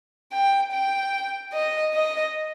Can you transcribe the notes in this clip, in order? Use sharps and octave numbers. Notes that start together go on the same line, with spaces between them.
G5
G5
D#5
D#5